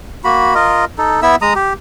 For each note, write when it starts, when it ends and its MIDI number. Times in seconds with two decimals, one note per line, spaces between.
0.24 0.54 58
0.24 0.54 66
0.24 0.54 83
0.55 0.85 65
0.55 0.85 70
0.55 0.85 75
0.98 1.20 63
0.98 1.20 69
1.22 1.36 59
1.22 1.36 64
1.22 1.36 76
1.22 1.36 88
1.42 1.53 56
1.42 1.53 82
1.42 1.53 87
1.55 1.73 67